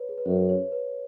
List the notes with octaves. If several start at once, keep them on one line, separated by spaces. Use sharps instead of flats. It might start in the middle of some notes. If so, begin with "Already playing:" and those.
Already playing: B4 C#5
G#4
B4
F#2 C#5
C#5
B4